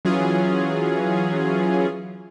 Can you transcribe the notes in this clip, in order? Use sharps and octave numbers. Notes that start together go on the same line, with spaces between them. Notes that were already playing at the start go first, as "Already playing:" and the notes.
E3 F#3 C#4 F4 G#4